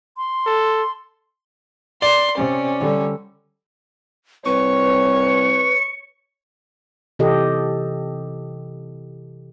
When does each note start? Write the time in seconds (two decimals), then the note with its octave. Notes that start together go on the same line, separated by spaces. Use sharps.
0.17 C6
0.46 A4
2.02 D5 C6
2.37 C3 C#4
2.80 D3 G3
4.46 C2 B4 C#5 C#6
7.19 C3 E3 G4 A4 D#5